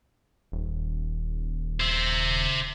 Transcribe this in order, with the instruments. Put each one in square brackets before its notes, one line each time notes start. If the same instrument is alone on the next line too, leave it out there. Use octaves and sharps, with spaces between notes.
[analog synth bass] D#1
[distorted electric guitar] C5 E5